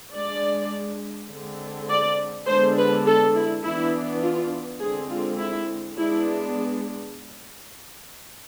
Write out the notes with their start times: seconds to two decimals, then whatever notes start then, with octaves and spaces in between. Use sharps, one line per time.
0.14 G#3 D4 D5
1.31 D3 G#3 C4
1.89 D5
2.47 D3 G#3 B3 D4 C5
2.77 B4
3.06 A4
3.35 E4
3.64 E3 B3 D4 E4
4.22 F4
4.80 D3 G#3 C4 G#4
5.09 F4
5.38 E4
5.97 G#3 B3 D4 E4